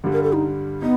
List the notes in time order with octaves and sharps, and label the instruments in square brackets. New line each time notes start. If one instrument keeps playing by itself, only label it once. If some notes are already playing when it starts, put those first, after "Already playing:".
[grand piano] G2 D3 G3
[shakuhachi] A#4
A4
D#4
[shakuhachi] B3 [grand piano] D#4